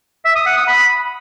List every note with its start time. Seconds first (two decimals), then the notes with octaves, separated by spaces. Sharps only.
0.25 E5
0.35 D#6
0.46 F#5
0.57 D#6
0.67 B5